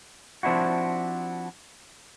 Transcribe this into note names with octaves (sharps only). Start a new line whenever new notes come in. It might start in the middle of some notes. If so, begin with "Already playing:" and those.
F3 C4 D4 E4 F#4